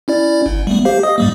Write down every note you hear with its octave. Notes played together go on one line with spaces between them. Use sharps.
C#4 E4 D5
G1
G3 A3 B3
G4 C5 F5
D#5 D#6
G#2 G3 A#3